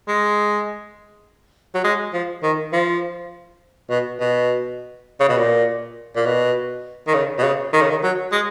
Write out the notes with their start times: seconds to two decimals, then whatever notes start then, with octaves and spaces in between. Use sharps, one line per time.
0.07 G#3
1.74 F#3
1.84 G#3
2.13 F3
2.43 D#3
2.72 F3
3.90 B2
4.20 B2
5.20 C#3
5.28 B2
5.37 A#2
6.15 A#2
6.25 B2
7.06 D#3
7.14 C#3
7.38 B2
7.43 C#3
7.73 D#3
7.81 C#3
7.90 D#3
8.02 F#3
8.32 G#3